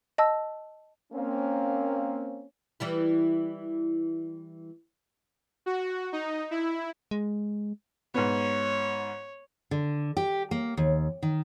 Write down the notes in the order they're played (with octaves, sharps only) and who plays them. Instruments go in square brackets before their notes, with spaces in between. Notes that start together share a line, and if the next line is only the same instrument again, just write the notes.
[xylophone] D#5 A5 E6
[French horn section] A#3 C4 C#4
[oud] E3 G3 E4
[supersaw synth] F#4
D#4
E4
[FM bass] G#3
[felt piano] G#2 B3 [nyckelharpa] C#5
[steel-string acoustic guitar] D3
G4
A#3
D#2
D#3